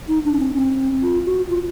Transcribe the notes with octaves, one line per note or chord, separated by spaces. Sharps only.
D#4
D4
C#4
C4
C4
F4
F#4
F4